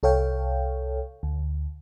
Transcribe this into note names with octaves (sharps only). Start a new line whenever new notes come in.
C2 A4 C#5 F5 G5
D2